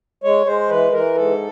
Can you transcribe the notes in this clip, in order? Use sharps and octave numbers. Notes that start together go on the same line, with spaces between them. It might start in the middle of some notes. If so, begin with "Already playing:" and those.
G#3 C#5
G#3 C5
E3 B4
E3 A#4
G#2 A4